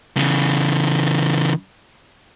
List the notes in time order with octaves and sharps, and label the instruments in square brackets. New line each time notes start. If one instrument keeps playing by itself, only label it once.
[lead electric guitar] C#3 E3